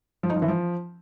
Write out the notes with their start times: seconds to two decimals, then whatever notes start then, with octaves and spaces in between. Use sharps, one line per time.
0.23 F3
0.30 D#4
0.36 F3
0.42 E3
0.48 F3